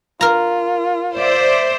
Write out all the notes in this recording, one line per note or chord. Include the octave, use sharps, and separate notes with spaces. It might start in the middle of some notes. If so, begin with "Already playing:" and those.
F4 A#4 A#5
C5 D5 E5